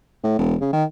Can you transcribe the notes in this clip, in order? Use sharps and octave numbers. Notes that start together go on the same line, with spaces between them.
A2
E1
C#3
D#3